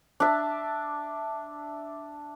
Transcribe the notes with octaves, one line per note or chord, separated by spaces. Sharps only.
D4 E5